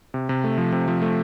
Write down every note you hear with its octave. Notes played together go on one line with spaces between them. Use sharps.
C3
C3
A3
F3
C3
F3
A3